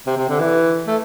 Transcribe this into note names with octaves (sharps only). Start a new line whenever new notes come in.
C3
C3
D3
E3
A3